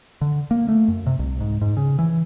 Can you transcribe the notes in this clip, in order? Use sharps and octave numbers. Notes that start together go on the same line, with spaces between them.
D3
A#3
A3
F#2
C3
C2
G#2
G#2
C#3
E3